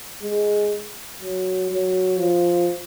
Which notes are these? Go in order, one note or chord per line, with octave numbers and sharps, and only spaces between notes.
G#3
F#3
F#3
F3